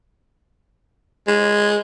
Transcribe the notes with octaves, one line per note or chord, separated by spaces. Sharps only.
G#3